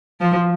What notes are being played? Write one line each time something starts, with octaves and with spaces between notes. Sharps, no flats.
F3